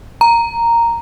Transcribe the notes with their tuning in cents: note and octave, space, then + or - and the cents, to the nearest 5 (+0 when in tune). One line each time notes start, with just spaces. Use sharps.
A#5 -5